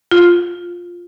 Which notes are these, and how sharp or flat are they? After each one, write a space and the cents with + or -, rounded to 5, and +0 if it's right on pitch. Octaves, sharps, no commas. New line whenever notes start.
F4 +5